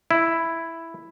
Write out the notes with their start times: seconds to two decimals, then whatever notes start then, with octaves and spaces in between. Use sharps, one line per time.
0.11 E4